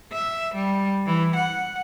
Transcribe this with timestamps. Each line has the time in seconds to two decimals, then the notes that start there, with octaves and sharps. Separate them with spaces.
0.12 E5
0.55 G3
1.06 E3
1.36 F#5